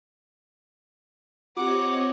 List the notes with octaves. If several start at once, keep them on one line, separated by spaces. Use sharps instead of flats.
C4 F4 G4 C#5 D#5 F#5 D6